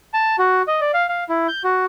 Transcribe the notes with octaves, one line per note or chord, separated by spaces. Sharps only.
A5
F#4
D#5
D5
F5
F5
E4
G6
F#4